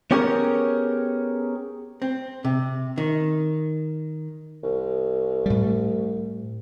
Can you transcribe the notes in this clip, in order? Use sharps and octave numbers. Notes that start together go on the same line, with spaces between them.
B3 C#4 G4 G#4 A#4 C#5
C4
C3
D#3
C2
A2 G3